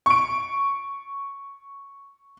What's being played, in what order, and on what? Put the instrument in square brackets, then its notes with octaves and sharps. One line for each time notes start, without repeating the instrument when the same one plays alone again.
[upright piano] C#6 D7